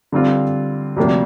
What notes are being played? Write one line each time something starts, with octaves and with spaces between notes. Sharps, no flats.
D3 G3 C4 F4
D2 C3 F3 A#3 D4